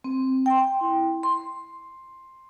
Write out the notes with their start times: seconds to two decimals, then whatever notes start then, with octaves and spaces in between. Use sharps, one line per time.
0.04 C4
0.46 G5 C6
0.81 E4
1.23 C6